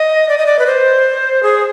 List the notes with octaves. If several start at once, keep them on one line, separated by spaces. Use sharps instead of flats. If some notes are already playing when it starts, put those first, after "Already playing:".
Already playing: D#5
D5
D#5
D5
B4
C5
G#4